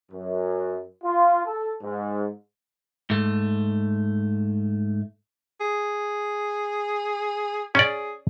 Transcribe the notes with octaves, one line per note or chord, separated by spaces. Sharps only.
F#2
F4
A4
G#2
G#2 A3
G#4
C#4 G#4 D5